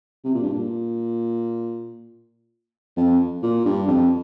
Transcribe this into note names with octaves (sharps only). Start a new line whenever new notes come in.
C3
A#2
G2
A#2
F2
A#2
G2
F2